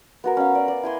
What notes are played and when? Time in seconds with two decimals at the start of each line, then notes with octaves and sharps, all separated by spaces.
0.24 B3 F#4 A#4
0.37 C#4 F5
0.55 D5
0.68 D5
0.83 E4 G#5 C6